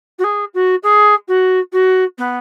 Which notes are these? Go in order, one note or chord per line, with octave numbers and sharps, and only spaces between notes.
F#4
G#4
F#4
G#4
F#4
F#4
B3